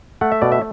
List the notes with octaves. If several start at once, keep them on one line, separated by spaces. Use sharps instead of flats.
A3 F#5
E5
B2 D5
E5